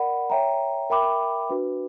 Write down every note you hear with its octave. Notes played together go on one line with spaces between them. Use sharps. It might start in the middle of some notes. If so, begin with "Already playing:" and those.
Already playing: A#4 D5 F#5 B5
C#5 E5 G5 A#5
A#4 E5 G5 B5 D6
D4 F#4 B4